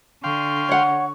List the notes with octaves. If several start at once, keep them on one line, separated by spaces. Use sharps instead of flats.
D3 F5 G5 C6 C#6
C#5 F#5